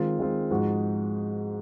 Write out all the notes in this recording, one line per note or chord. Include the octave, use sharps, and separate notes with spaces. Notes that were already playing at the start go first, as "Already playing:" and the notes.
Already playing: D#3 G#3 C4 F4
D#3 G#3 C4 F4
G#2 F3 G#3 D#4 F#4